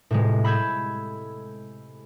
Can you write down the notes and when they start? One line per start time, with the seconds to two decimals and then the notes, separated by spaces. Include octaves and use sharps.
0.11 A2 C3 G#3
0.44 B5 E6 G6 G#6